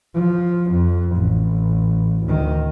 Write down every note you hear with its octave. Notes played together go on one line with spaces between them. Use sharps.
F3
F2
A1
D2 D#3